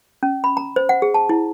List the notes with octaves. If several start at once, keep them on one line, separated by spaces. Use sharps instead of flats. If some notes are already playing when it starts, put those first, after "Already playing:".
C#4
B5
A#5
C5
F#5
G#4
A5
E4